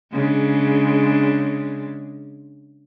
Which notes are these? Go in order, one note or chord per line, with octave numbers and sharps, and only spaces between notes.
C#3 G#3 D4